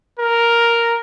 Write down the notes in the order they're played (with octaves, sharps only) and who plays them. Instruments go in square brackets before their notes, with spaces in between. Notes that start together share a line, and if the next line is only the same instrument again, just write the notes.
[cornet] A#4